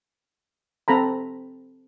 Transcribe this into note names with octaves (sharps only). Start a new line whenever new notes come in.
C4 A4 A#5 B5